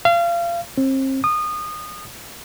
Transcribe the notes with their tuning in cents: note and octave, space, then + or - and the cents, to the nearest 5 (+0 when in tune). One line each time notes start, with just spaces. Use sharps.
F5 -30
C4 +35
D#6 -25